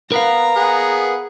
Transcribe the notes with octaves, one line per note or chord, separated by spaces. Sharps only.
B3 A#4 B4 F5 A#5
B3 G#4 F#5